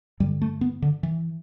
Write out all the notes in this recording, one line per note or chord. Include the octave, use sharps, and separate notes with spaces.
G2 D3 G3
A3
B3
D3
E3